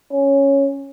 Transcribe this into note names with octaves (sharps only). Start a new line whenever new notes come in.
C#4